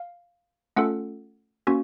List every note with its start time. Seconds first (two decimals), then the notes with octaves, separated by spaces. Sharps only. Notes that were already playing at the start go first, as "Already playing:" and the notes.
Already playing: F5
0.76 A3 C#4 F4 A4 F#5
1.67 A#3 C#4 F#4